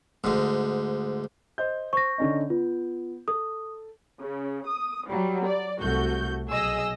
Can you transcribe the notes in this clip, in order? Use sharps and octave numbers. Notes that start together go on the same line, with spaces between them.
D2 G#2
C5 D#5 G6
C5 C#6 A#6
D3 C#4 D#4
B3 F4
A4 D#6
C#3
D#6
F#3 G3
D5
C2 A3 F#4 G6
B1 G#4 D#5 E6